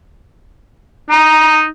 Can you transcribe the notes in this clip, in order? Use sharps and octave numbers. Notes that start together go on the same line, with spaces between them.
D#4 A#5